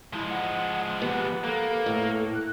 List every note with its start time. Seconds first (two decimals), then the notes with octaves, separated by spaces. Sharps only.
0.13 F3 G#3 E4
0.29 F#5
1.02 B3 G4 F#5
1.44 A#3 A4
1.86 A2
2.34 F#6